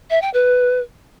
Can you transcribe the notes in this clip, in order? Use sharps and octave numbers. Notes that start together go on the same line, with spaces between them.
E5
G5
B4